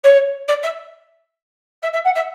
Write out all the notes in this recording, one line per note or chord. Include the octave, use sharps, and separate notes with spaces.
C#5
D5
E5
E5
E5
F#5
E5